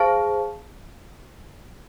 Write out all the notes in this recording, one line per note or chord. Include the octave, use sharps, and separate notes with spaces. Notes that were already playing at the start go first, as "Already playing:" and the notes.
Already playing: G#4 C5 F5 A5